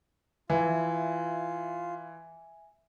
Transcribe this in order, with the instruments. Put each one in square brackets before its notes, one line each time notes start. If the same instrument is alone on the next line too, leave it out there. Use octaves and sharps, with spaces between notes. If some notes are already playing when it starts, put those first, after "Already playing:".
[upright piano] E3 [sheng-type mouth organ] F4 [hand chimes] E5 G#5